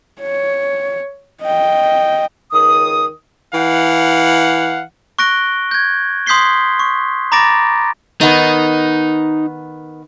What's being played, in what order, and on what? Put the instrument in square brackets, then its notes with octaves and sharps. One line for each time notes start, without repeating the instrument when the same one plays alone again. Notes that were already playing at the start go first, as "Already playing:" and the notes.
[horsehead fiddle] C#5
D#5 G5
[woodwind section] C#2 D#3 D#6
[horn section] E3 F5 F#5
[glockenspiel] C#6 F#6 A#6 D7 G7
G6 G#6
C6 D#6 G6 B6 C7 G7
C#6
A#5 B5 D6 A6 A#6 D7
[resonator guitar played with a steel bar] D#3 B3 [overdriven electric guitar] D#4